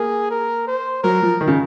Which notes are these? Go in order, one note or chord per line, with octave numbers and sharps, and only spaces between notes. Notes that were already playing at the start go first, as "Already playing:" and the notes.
Already playing: A#3 G#4
A#4
C5
F#3 A#4
F3
D#3
C#3